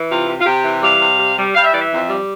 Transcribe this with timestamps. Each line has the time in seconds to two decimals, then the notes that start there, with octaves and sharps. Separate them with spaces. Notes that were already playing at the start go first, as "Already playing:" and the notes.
Already playing: E3
0.09 C3 F4
0.28 C3
0.40 F4
0.46 C3 G4
0.64 E3
0.83 G3 F5
1.00 C3
1.19 G3
1.37 G3
1.55 G3 F5
1.64 E5
1.72 E3 D5
1.80 E5
1.91 F2
2.10 G3